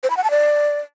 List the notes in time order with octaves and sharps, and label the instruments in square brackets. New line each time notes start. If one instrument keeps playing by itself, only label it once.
[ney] C5
B5
F#5
A5
D5